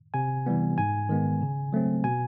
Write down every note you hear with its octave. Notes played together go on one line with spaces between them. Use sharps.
C3 G#5
E3 G3 B3
G#2 G#5
D#3 G#3 B3
C#3
F#3 A3 C4
B2 G#5